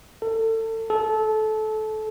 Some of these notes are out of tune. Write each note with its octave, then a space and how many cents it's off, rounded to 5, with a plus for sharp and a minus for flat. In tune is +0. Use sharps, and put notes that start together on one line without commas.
A4 +30
A4 -20